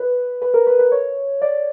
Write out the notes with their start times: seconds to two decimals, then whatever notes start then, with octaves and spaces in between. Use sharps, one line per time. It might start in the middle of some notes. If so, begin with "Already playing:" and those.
Already playing: B4
0.42 B4
0.54 A#4
0.67 B4
0.79 B4
0.92 C#5
1.42 D5